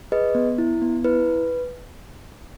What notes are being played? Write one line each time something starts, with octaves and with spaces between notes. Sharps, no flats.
G#4 B4 D#5
B3
E4
B3
E4 B4